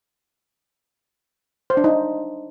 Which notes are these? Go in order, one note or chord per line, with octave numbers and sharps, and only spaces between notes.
C5
D4
D#4